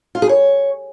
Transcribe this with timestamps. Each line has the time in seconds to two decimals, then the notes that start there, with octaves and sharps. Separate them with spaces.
0.15 F4
0.22 G#4
0.29 C#5